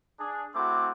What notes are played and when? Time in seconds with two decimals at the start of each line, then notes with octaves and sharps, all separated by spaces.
0.19 D4 G#4
0.55 A3 C4 E4 F#4 C5 D6